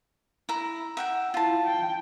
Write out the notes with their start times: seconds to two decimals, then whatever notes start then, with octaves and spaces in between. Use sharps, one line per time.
0.49 E4 A#5
0.97 E5 F#5 G5
1.34 E4 F4 A5
1.66 G5